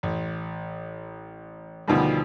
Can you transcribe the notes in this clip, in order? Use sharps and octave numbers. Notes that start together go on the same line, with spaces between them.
A1
D2 B2 D#3 F3 G3